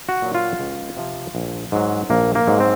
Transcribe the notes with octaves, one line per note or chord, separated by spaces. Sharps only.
F#4
A#2 F#3
F4
C#2
C3 F3
A#1
G#2 F#3
A#1 A#3
A#3
G#2 F#3
C4